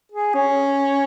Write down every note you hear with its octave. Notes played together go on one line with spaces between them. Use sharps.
G#4
C#4